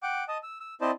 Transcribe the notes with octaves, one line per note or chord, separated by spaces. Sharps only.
F#5 G5 D6
D#5 A5 D#6
E6
E6
C4 E4 C5 D5 D#5 A5